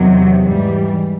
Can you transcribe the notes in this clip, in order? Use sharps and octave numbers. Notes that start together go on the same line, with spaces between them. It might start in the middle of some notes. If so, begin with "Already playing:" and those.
Already playing: E2 C3 D#3 F#3
G#2 E3 G3